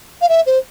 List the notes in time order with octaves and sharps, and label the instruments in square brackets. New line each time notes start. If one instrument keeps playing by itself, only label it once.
[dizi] F5
E5
C5